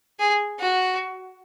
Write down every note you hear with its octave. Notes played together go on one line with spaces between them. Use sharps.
G#4
F#4